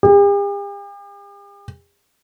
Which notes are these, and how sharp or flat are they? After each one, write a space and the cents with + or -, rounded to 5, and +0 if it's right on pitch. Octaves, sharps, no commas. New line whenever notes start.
G4 +45